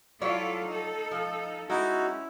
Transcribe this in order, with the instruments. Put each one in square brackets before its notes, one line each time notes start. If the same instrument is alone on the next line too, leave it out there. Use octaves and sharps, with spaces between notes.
[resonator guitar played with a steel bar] F#3 C#5 D5 [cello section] E4 F4 A4
[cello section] D#4 A4
[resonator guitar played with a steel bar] F3
[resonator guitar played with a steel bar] G#3 [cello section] C#4 [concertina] D#4 F#4 [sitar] E4